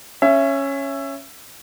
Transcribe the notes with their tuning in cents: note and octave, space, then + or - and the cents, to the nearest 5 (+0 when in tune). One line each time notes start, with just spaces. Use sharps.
C#4 -5 E5 +20